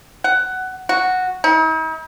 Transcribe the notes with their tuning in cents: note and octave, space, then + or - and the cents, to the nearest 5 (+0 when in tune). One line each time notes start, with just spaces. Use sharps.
F#5 +15
F#4 -5
D#4 +45